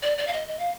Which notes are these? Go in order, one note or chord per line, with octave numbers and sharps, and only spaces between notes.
D5
D5
F5
D#5
D#5
F5